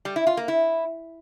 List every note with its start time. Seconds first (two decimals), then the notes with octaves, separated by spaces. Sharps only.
0.05 G3
0.16 E4
0.27 F4
0.37 A#3
0.48 E4